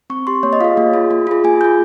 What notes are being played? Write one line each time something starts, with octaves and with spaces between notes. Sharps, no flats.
C4 C#6
G4 C6
A#3 C#5
D#5
F4 G#4 F5
A#3
F4 G#4
A#3
F4 G#4
A#3 G#5
F4 G#4 G6